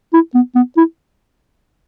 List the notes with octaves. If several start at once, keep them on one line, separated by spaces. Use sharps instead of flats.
E4
B3
B3
E4